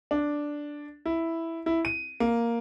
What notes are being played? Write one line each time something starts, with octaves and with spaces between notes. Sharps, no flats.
D4
E4
E4
D#7
A#3